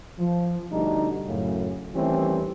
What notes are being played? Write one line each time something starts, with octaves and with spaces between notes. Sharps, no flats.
F3
D2 B2 G3 D4 D#4
F#2 A2 C#3
D#3 E3 G3 A3 C4 C#4